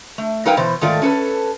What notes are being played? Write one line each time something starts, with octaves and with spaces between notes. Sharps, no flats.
A3
F#3 D#4 A#4 B4 F5 G5
B2 E3 C5
G#2 D#3 A3 F4 D5
C#4 A4 B4